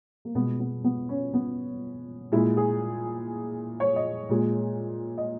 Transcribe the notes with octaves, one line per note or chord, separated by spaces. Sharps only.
A#3
B2 G#3 B3
B3
B3
C#4
B3
A#2 G#3 E4
G#4
C#5
D#5
A#2 G#3
D#5